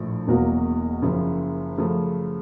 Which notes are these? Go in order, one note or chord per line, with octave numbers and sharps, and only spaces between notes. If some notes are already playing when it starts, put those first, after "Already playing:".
Already playing: A#1 A2 F3 A3
E1 E2 B2 F#3 A#3
F#1 F#2 C#3 F3
F#2 C#3 F3 A3